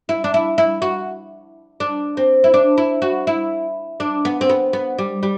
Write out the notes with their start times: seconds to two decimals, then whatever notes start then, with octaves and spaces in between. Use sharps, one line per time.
0.09 E4
0.24 D4
0.34 E4
0.58 E4
0.82 F#4
1.80 D4
2.17 C4
2.44 E4
2.54 D4
2.78 E4
3.02 F#4
3.27 E4
4.00 D4
4.25 B3
4.41 C4
4.50 B3
4.73 B3
4.99 G3
5.23 G3